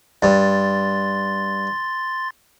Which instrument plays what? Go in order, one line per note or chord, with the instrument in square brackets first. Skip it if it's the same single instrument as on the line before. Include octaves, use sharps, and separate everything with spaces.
[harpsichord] G2 [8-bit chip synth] C6 A6